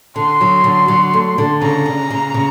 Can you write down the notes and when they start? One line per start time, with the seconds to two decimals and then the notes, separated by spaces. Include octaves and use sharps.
0.16 D3 C6
0.41 F#3
0.64 D3
0.88 F#3
1.13 A3
1.38 D3
1.62 C#3 A#5
1.86 C#3
2.10 C#3
2.34 C#3